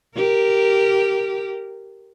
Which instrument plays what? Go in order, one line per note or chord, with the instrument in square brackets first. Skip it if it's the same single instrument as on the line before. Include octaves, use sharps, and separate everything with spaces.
[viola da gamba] G4 A#4